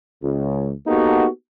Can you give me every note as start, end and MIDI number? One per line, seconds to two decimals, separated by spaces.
0.23 0.71 37
0.87 1.27 58
0.87 1.27 59
0.87 1.27 63
0.87 1.27 66
0.87 1.27 67
0.87 1.27 69